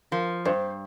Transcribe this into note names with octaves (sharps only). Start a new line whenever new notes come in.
F3 A#4
G2 C5